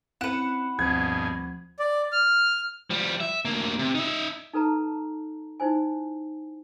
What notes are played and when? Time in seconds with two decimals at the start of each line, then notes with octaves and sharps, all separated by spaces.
0.21 C4 C#4 E4 B4 F#5 E7
0.79 D2 G2 B2 F3 C4 G#4 G#6
1.79 D5
2.12 F6
2.90 F3 G3
3.20 E5
3.45 D2 A#3
3.79 C3
3.95 D#4 E5
4.53 D#4 A4 B4 A5 A#5
5.60 D#4 E4 C5 G#5